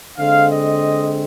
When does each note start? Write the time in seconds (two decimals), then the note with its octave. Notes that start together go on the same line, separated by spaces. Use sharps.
0.17 D3 G#3 C4 F5
0.50 D#5